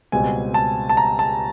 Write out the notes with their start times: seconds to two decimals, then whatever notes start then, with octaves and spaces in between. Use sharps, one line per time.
0.12 C#2 B2 G3 C4 G#5
0.54 A5
0.89 A5
0.97 A#5
1.19 A5